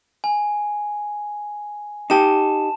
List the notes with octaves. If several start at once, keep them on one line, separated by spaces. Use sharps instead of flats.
G#5
D#4 G4 A5 E7